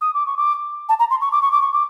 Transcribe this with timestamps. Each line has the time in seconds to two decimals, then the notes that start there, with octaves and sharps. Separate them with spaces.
0.01 D#6
0.14 D6
0.26 C#6
0.37 D6
0.89 A5
0.99 A#5
1.10 C6
1.21 C#6
1.32 D6
1.42 C#6
1.52 D6
1.61 C#6
1.73 D6